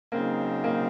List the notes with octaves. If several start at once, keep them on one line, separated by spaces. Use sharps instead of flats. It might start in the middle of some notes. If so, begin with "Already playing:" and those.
C#3 F#3 A#3 C4 D#4
A#3